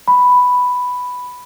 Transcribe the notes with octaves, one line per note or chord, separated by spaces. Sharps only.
B5